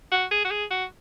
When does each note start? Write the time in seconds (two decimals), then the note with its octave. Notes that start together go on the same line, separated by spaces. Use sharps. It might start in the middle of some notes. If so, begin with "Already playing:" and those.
0.12 F#4
0.31 G#4
0.45 F#4
0.51 G#4
0.71 F#4